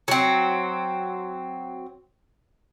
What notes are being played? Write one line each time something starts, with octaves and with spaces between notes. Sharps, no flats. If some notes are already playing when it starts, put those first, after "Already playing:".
F#3 C4